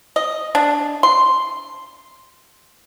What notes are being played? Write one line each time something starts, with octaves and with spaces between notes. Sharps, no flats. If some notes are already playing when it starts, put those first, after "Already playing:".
D#5
D4
C6